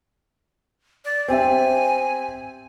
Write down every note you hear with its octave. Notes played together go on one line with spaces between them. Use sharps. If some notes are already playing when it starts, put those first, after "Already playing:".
D5
C4 G4 E5 G#5